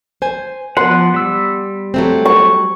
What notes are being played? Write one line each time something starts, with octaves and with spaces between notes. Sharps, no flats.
C5 G#5
F3 B3 F#5 C6
G3 E6
F#3 A3 C4
C#6